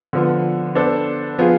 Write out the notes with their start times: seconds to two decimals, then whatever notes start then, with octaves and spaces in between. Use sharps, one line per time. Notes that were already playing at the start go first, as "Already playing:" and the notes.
0.13 D3 F3 B3
0.75 B3 D4 A4 C5
1.39 F3 B3 F4 G#4